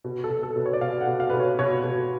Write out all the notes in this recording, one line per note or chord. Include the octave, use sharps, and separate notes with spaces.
B2
A4
B2
A4
B2 B4
C#5
D5
B2 F5
F#5
B2
F5
B2 B4
C#5
B2 C#5
B2